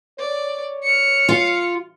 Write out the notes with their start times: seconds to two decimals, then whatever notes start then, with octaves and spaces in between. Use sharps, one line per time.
0.20 C#5 D5
0.84 F6 C#7
1.29 F4